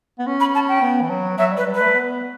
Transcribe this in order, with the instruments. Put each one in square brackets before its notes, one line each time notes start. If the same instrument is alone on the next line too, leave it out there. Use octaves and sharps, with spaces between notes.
[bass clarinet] B3
C#4
[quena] B5
A5
G5
[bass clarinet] B3
E3
F#3
[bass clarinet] F#3 [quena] E5
[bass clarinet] G3 [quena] B4
[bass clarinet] G3
[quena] B4
[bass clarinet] A3
B3